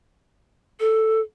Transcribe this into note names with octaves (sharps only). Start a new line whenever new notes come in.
A4